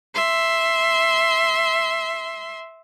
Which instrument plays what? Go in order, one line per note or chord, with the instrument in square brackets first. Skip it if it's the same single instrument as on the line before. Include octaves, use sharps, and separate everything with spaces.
[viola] E5 C6